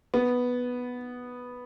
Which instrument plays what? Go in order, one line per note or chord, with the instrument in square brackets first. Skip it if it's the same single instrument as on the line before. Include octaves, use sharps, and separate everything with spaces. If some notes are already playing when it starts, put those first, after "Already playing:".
[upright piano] B3